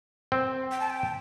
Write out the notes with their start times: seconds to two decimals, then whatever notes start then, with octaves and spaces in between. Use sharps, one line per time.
0.32 C4
0.72 G5
0.80 A5
0.90 G5